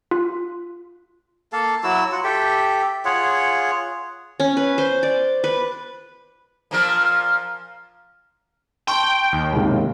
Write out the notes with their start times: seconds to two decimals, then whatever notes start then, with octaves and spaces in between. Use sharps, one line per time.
0.11 F4
1.53 A#3 A4 F5 A5
1.83 F#3 E4 F#4 E6
2.12 F4 F#4 F#5
2.24 G4 A4 E5 G5
3.05 F4 G#4 C#5 F#5
4.40 C#4
4.57 B4
4.78 C5
5.03 D5
5.44 B4
6.71 A#2 F3 A#4
8.87 G5 A5 C6 C#6
9.33 D#2
9.52 F#1 C2 G#2